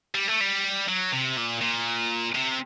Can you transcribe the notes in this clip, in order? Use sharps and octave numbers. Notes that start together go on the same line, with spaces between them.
G3
A3
G3
F#3
C3
A#2
A#2
C3